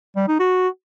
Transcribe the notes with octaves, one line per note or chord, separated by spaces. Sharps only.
G3
D#4
F#4